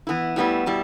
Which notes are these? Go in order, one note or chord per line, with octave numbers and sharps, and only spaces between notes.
E3 B3 E4
A2 G3 B3 E4
B2 G3 E4